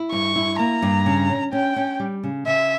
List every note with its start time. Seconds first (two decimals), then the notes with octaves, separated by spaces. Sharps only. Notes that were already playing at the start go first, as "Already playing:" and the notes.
Already playing: E4
0.12 G2 C#6
0.36 E4
0.59 A#3 A#5
0.82 G2
1.06 C#3
1.30 C#4
1.53 C#4 G5
1.76 C#4
2.00 G3
2.23 C#3
2.46 C#3 E5